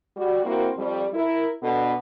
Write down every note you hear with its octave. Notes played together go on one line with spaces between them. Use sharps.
G3 F#4
A#3 C4 E4 F#4 A#4
F2 G3
E4 A#4
B2 B3 D4 A4